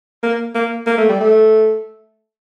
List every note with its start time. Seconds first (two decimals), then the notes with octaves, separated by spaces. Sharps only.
0.23 A#3
0.55 A#3
0.86 A#3
0.98 A3
1.09 G3
1.21 A3